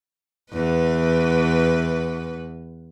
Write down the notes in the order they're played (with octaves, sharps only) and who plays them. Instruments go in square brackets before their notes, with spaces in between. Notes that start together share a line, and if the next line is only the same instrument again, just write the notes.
[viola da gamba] E2 B4